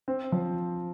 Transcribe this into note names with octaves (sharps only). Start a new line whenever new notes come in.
C4
F3